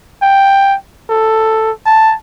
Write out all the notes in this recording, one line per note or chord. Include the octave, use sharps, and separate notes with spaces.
G5
A4
A5